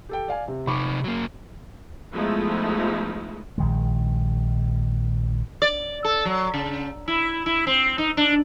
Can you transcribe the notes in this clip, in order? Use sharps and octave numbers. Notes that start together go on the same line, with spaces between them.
G4 A4 G5
D5 F5 G#5
C3
C3 D#4 B5 C#6 D6
F#3 A#3
F3 G#3 A3 B3 D#4 E4
A#1 D#3 G#3
D5
A4
F#3
C#3
E4
E4
C4
D#4
D4